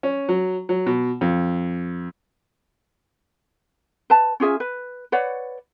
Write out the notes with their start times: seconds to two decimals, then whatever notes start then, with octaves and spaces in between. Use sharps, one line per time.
0.03 C#4
0.29 F#3
0.69 F#3
0.86 B2
1.21 F2
4.10 B4 A5
4.40 C#4 F4 G#4 E5
4.60 B4
5.12 B4 C#5 D5 F#5